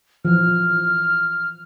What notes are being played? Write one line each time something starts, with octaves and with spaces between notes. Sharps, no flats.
E3 F3 F6